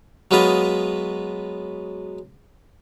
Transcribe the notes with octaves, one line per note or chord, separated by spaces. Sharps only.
F#3 G#3 B3 F4 B4 D#5